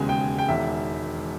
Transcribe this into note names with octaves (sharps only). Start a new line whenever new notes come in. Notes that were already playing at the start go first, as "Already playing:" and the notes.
Already playing: E1 D#2 C#3 G#3 B3 G#5
G5
G5
E1 E2 D#3 E5